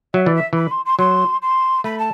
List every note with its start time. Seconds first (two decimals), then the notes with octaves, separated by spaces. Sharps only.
0.13 F#3 E5
0.24 E3 D5
0.34 E5
0.53 E3 B5
0.70 C6
0.85 C6
0.98 F#3 C6
1.41 C6
1.84 A3 B5
1.98 A5